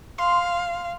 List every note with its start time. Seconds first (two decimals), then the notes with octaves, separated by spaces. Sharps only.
0.18 F5 C6